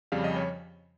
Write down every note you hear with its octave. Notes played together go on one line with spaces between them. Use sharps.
F2 C#3 G3 C#4 F5
D#5
C#5